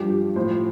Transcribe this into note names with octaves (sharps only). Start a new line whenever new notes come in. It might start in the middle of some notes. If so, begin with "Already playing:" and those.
Already playing: G2 F3 G4
G4
A2 F3 C5